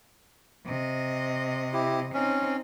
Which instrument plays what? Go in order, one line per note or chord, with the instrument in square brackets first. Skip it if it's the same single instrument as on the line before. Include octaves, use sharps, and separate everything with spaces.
[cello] C3 D#5
[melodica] E4 G4
[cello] C4 D#4 [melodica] C#4